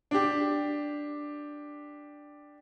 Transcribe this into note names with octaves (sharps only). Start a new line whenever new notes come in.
D4 G4